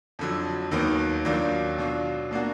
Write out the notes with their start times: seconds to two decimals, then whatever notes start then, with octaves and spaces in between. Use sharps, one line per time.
0.19 F2 D3 F#3
0.71 D#2 D#3 F#3 B3
1.25 D#2 D#3 F#3 D4 F4
1.78 B2 F#3 D4 F4
2.31 B2 A#3 D4 F#4